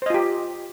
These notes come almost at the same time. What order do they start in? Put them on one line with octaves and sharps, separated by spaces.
C5 D#5 F4 G4